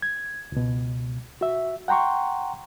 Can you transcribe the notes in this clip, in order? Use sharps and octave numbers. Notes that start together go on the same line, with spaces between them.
G#6
C#2 B2
F#4 E5
F#5 G5 A#5 C6 C#6